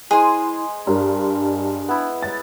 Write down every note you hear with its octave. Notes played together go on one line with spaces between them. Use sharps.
G#3 E4 G#4 C5 G#5
G2 D4 A#4
B3 E4
A6